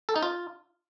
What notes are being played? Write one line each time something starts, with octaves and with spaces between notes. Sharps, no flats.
A4
D#4
F4